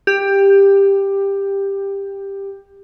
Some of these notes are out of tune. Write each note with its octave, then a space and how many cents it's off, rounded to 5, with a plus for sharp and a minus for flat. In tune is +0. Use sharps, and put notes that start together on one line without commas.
G4 +10